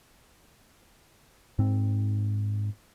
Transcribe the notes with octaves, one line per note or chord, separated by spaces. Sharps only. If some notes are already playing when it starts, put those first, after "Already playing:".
G#2 C4